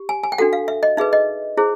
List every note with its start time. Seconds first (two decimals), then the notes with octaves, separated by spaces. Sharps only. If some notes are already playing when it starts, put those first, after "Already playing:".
Already playing: G4
0.09 G#5
0.23 G#5
0.32 G5
0.38 D4 F#4 A4 F#5
0.53 F5
0.68 E5
0.83 D#5
0.97 D#4 G#4 B4 E5
1.13 D#5
1.57 E4 G#4 C5